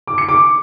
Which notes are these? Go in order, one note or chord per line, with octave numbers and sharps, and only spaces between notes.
D6
C#7
D6